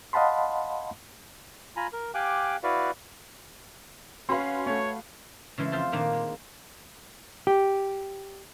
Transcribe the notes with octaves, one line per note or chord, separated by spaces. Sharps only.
D#5 F5 F#5 A5 B5 C6
F4 G#5 A#5 B5
A#4
G4 F5 G5 G#5 D6 F#6
E4 F#4 B4 D5 F5
C#4 F#4 B4 F5 B5 C6
A3 C#5
C#3 E3 G#3 A3
F2 F4 C5 E5 A5
A#2 D#3 A#3 D4
G#3
G4